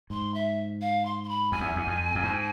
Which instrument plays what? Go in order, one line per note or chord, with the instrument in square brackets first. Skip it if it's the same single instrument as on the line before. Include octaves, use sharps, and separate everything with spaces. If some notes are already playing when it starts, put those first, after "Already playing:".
[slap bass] G#2 [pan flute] C6
[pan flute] E5
F5
C6
C6
B5
[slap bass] F2 [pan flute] G#5
[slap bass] E2
E2
F2
F2
G#2